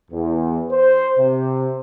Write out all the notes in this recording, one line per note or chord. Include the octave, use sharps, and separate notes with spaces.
E2
C5
C3